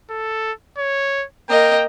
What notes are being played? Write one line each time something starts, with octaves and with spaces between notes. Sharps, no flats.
A4
C#5
A#3 D#5 G5